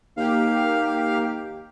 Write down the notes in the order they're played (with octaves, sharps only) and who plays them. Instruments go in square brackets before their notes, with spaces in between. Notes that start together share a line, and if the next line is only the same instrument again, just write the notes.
[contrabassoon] D#2 [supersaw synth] A#3 G4 [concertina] F5